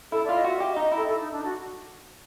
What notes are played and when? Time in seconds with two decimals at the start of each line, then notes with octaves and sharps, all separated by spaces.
0.12 E4 A4
0.25 D5
0.29 F4
0.36 D#5
0.44 F#4 E5
0.60 G4
0.72 D#5
0.77 D#4
0.84 D#5
0.92 E4 A4
1.08 A4
1.20 D#4
1.32 D4
1.44 F#4